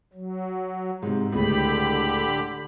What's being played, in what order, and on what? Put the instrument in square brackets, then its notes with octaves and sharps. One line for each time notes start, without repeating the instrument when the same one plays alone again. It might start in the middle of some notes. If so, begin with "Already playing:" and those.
[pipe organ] F#3
[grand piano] G#2 C3
[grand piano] C#2 A2 [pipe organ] D3 G4 B5